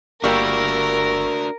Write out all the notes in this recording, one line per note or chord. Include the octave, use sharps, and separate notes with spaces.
G1 G3 A#3 D4 F#4 A#4 C#6 E6